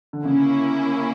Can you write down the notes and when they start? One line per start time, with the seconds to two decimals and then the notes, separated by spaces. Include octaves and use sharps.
0.13 D3
0.24 C#3 A#3 C#4 E4